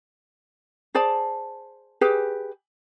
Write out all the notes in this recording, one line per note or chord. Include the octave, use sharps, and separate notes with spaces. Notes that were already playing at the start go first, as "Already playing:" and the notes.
G#4 C5 D5 A5
G4 G#4 B4